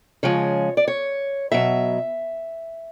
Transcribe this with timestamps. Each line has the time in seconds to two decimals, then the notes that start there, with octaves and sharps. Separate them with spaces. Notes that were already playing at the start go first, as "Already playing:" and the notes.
0.23 C#3 F3 G#3 C#5
0.77 D5
0.88 C#5
1.52 B2 F#3 E5